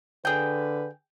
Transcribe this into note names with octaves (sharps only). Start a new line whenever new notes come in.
D3 G#4 B4 G5